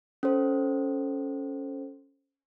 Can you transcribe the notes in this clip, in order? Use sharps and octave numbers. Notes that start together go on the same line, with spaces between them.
C#4 A4 C5